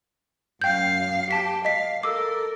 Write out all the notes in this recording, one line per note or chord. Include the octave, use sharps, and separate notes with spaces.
F#2 F5 G5 G6
G4 A5 B6
D#5 F5 B6
A4 A#4 D6 E6